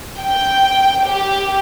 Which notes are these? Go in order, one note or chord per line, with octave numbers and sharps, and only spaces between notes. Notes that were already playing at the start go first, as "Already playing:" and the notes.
G5
G4